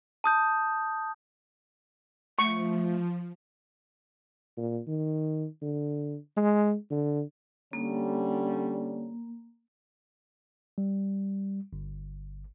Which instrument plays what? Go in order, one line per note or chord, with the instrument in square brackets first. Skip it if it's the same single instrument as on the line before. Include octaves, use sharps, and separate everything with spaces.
[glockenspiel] A5 D#6 G6
[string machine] F3 [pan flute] A3 [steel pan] C#6
[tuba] A#2
D#3
D3
G#3
D3
[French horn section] D3 G3 C#4 [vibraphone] A#3
[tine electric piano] G3
G1